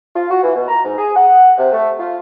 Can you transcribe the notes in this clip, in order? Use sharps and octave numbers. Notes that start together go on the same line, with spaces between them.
F4
F#4
E3
B2
A#5
G#2
G#4
F#5
C3
A3
F4